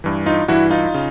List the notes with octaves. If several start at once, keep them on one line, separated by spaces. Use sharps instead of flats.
G2 E3
D#4 F4
G2 E3 E4 F#4
D#4 F4
C#3